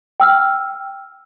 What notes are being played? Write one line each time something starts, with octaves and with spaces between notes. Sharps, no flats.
G5 E6 F6